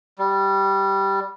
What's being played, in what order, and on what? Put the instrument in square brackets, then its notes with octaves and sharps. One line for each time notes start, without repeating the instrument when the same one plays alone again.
[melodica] G3